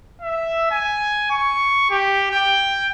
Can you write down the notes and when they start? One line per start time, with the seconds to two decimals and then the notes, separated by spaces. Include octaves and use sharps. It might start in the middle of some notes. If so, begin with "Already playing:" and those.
0.22 E5
0.71 G#5
1.31 C#6
1.90 G4
2.31 G5